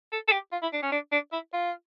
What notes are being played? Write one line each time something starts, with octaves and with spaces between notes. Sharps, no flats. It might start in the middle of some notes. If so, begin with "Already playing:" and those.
A4
A4
G4
F4
E4
D4
C#4
D4
D4
E4
F4